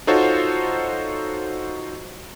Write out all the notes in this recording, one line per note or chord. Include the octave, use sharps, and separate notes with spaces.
D#4 F4 F#4 A4 C5 C#5